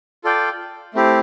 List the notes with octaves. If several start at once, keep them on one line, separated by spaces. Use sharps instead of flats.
F4 A4 D5 G5
A3 C4 E4 G4